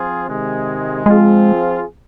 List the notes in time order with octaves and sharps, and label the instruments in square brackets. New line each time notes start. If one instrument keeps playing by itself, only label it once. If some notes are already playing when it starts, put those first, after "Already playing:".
Already playing: [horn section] F3 C4 F4 G#4
C3 D#3 G#3
[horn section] F3 C4 F4 G#4 [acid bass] G#3